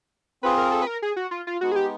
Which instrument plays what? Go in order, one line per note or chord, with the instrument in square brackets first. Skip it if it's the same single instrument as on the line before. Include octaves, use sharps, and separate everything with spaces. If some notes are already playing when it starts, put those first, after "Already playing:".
[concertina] C4 F4 G#4 [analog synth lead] B4
[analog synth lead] A#4
A4
B4
A#4
G#4
F#4
F4
F4
[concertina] G#3 B3 D#4 [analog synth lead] F#4
[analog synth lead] G#4
G4